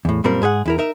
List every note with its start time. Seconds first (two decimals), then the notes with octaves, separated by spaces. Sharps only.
0.05 E2 A2
0.24 F#2 A#2 G3 C4 A#4
0.42 G#2 G#4 C5 F#5
0.66 E2 E4 A#4
0.78 D#4 A#4 E5